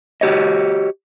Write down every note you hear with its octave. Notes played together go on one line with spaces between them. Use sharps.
F#4 G4 C#5 D#5